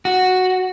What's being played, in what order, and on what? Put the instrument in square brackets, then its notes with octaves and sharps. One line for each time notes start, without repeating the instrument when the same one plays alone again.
[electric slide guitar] F#4